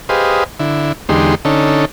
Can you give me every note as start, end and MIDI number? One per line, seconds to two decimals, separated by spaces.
0.09 0.44 67
0.09 0.44 68
0.09 0.44 71
0.09 0.44 72
0.09 0.44 75
0.09 0.44 77
0.60 0.92 50
0.60 0.92 64
1.09 1.35 40
1.09 1.35 50
1.09 1.35 56
1.09 1.35 63
1.09 1.35 67
1.09 1.35 84
1.45 1.85 50
1.45 1.85 61
1.45 1.85 63
1.45 1.85 69